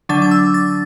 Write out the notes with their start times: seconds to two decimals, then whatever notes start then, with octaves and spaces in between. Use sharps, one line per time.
0.09 D3 F#3 D4 A6
0.22 D6
0.31 E6
0.54 A6